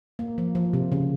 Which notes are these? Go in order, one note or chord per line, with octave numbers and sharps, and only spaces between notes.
A#3
F3
F3
C3
C#3